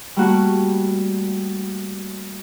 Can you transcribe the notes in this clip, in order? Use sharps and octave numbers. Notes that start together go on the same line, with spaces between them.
G3 A3 A#3 F#4 F#5